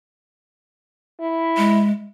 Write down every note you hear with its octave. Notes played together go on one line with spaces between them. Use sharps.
E4
G#3